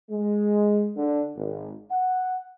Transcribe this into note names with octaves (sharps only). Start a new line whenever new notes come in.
G#3
D3
G#1
F#5